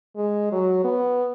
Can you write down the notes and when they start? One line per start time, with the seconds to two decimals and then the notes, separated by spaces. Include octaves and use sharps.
0.16 G#3
0.52 F#3
0.84 B3